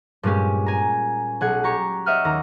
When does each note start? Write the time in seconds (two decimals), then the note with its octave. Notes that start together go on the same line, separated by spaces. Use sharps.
0.23 G2 A#2 G#3 C#4 G4
0.66 G#5 A#5
1.41 B1 G#4 F#5 G#6
1.64 G4 A#5 C#6
2.06 C#5 D#5 E5 F#5 D#6 F6
2.25 D#2 A#5